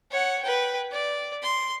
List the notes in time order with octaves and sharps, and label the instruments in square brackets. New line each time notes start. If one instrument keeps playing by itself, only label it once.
[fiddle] C#5 F#5
B4 G5
D5
C6